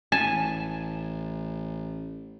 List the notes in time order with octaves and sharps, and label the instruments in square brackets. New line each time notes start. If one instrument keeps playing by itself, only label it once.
[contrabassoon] A1 [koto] G#5 A5